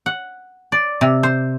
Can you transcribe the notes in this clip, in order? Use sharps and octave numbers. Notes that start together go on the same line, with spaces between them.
F#5
D5
C3
C5